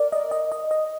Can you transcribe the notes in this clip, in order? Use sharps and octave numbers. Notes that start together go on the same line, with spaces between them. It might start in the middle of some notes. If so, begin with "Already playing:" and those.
Already playing: A#4 D5
D#5
D#5
D#5
D#5